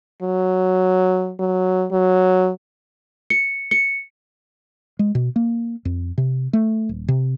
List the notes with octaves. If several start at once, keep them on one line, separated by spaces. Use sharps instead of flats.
F#3
F#3
F#3
C#7
C#7
G#3
B2
A#3
F2
C3
A3
D#1
C3